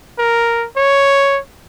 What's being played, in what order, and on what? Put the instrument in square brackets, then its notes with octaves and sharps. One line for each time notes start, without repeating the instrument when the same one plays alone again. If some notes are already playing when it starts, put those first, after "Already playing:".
[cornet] A#4
C#5